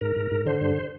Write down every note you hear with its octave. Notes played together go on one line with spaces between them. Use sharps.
G#2 A#4
G#2
G#2
D3 C5
G2